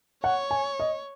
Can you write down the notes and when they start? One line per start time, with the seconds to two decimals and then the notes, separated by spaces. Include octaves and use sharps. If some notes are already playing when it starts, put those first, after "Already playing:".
0.24 C#5 F#5
0.51 G#5
0.80 D#5